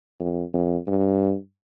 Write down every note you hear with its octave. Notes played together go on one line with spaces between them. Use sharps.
F2
F2
G2